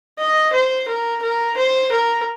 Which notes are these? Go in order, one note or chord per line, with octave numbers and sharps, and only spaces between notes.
D#5
C5
A#4
A#4
C5
A#4